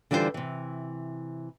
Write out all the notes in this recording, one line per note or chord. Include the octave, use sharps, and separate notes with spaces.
D3 E3 G3 F4 G4 C5
C3 E3